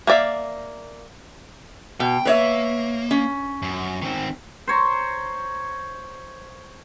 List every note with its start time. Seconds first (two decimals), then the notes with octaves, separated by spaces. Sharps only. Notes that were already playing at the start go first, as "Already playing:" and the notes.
0.07 A#3 B3 D5 E5 F5
2.00 B2 G5
2.25 A#3 B4 C#5 E5
3.11 C#4
3.62 F#2
4.02 D#3 C4
4.67 C5 C#5 A#5